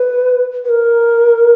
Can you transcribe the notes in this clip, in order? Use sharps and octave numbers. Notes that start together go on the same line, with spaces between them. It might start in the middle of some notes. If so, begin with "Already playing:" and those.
Already playing: B4
B4
A#4